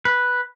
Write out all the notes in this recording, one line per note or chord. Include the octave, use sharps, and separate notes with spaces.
B4